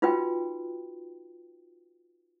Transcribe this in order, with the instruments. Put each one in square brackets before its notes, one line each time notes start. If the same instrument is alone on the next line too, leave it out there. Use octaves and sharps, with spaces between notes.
[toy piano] D#4 F4 F#4 B4 G5